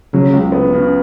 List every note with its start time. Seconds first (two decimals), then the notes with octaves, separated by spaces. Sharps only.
0.13 C#3 F#3
0.33 C#2
0.52 B3
0.73 C#3